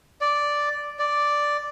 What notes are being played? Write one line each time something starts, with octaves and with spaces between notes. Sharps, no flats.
D5
D5